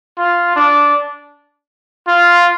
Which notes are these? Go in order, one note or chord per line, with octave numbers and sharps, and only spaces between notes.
F4
D4
F4